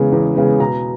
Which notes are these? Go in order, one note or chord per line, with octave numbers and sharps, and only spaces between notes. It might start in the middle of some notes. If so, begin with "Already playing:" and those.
Already playing: E2 C#3 G#3 B3
E2
C#3 G#3 B3
B2 A#5